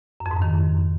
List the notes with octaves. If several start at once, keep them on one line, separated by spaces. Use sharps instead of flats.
F#2
F2
G#2
F#2
D#3